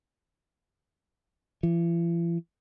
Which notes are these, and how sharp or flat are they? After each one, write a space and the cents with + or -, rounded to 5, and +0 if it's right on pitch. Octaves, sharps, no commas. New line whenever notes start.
E3 +45